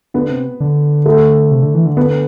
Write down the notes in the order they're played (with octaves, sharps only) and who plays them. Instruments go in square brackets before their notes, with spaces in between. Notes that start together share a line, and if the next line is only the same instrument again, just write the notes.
[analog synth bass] D3 [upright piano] B3
[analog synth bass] C3
D3
[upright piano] A3
[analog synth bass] C3
D3
E3
D3
[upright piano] B3